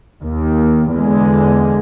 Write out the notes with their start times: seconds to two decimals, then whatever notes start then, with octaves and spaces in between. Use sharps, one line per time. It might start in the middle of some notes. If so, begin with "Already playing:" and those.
0.23 D#2
0.93 E2 D3 G#3